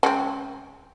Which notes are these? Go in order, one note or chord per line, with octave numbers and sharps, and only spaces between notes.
C#3 G#3 C4